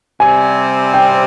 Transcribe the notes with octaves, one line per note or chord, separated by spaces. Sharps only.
C3 G3 C4 G#5
G5